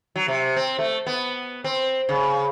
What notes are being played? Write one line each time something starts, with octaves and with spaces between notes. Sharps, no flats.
F#3
C3
C4
A3
B3
C4
C#3